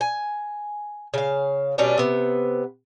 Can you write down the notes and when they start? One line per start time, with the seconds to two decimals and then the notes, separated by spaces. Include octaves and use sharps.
0.01 G#5
1.14 C#3 F5
1.78 B2 G3 C#4 D4
1.98 C3 B3